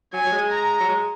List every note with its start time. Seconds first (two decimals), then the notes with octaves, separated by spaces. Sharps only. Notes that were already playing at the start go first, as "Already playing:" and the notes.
0.13 F#3 G#5
0.27 F#3
0.32 G#3
0.51 A#5
0.80 F#3
0.89 G#3